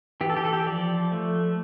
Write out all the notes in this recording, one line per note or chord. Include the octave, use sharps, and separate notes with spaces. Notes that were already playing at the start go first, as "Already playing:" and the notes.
E3 G4
A4
G4
A4
G4
F3 D5
A3